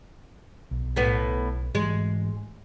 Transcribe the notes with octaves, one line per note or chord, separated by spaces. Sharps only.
B1
A2 B3
G#2 E3 G#3